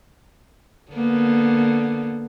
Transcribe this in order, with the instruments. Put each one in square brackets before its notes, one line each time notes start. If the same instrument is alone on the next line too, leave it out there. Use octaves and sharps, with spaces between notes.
[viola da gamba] D3 A#3 B3